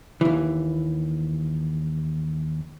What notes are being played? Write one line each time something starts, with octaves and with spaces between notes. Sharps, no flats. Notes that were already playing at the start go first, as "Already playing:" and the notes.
D#2 E3